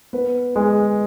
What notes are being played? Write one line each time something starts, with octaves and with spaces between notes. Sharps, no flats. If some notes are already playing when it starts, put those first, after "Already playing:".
B3 B4
G#3